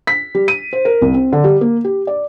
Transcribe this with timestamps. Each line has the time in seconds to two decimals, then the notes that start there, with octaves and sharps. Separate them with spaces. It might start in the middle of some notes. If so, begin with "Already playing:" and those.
0.07 B6
0.35 G3
0.48 D#7
0.73 C5
0.85 A#4
1.02 C2
1.14 C4
1.33 D3
1.44 G3
1.61 A#3
1.84 G4
2.07 D5